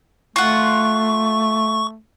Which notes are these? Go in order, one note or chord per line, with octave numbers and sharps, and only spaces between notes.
A3 F4 F#5 C#6